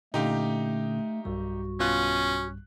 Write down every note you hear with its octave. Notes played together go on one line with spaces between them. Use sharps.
A#2 D3 A3 C#4 D#4 G4 F5
B1 G2 G3 F#4
B2 C#4 F4 F#6